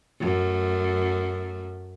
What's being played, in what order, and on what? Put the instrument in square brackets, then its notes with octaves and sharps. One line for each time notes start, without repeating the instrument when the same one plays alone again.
[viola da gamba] F#2 A3